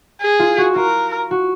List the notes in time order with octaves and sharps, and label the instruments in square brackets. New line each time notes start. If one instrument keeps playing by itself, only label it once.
[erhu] G#4
[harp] F4
F#4
[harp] F4 [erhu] A#4
[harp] F#4